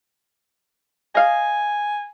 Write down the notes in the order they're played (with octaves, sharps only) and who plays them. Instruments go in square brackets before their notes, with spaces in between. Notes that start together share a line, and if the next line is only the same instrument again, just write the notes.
[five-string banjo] D#5 F5 [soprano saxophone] G#5